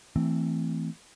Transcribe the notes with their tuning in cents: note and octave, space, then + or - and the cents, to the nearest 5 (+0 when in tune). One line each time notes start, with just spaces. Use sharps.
E3 +0 A3 +20 C4 +0